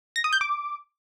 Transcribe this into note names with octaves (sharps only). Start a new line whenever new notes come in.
A#6
D#6
G6
D6